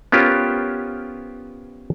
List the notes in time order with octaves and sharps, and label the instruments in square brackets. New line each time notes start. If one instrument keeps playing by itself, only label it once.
[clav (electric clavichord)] B3 C#4 F4 G4 A#4 C5